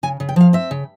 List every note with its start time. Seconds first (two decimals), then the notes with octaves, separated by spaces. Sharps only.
0.03 C#3 G#5
0.20 C#3
0.29 G5
0.36 F3 F5
0.53 C4 E5
0.71 C#3